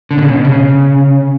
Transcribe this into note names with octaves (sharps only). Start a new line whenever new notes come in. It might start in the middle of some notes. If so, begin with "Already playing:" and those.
D3
B2
C#3
B2
C#3